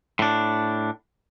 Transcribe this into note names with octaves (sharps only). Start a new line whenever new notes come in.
A2 D4